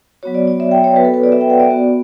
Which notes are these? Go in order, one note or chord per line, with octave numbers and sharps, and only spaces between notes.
F#3 B3 F#4 C#5
D5
D5
E5
G5
C#5
B3 F#4 B4
A4
B4
D5
E5
G5
F#5
D5
B3 F#4